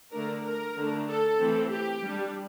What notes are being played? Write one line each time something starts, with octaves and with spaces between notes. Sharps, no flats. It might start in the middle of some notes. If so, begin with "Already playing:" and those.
D3 A3 D4 A#4
A#4
D3 A3 D4
A4
E3 A3 C4
G4
G3 D4